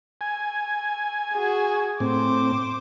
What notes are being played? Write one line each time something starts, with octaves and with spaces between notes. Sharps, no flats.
G#5
F#4 G#4
A2 C4 C5 D6